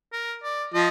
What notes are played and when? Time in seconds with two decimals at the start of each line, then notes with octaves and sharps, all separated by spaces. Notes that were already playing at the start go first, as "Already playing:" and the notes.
0.13 A#4
0.43 D5
0.74 F3 D#5